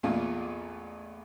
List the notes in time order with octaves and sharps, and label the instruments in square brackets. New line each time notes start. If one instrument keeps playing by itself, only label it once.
[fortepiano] A1 E2 A#2 F4